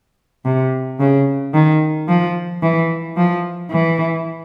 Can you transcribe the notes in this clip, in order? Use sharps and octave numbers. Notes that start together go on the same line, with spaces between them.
C3
C#3
D#3
F3
E3
F3
E3